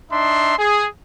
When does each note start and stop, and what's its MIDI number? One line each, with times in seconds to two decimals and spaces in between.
0.11 0.58 62
0.11 0.58 63
0.11 0.58 76
0.11 0.58 84
0.58 0.86 68